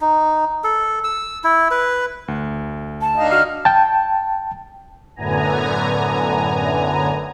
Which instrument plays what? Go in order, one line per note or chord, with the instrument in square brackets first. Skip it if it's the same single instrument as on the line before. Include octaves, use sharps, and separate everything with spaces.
[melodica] D#4
A4
E6
E4
B4
[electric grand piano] D2
[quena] A5
[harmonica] D3 D#4 F5
[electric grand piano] F#4 C7 [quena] F6
[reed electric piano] G5 A5
[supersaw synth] F#2 A2 D3 B3 G#5 A#5